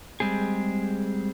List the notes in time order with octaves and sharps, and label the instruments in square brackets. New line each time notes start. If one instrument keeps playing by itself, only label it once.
[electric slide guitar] G3 G#3 C4 G#4